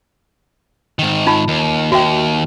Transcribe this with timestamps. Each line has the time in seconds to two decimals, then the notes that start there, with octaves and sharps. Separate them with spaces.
0.99 G#2 D#3
1.27 D#4 F4 A5
1.48 D#2
1.92 D#2 F#4 E5 G5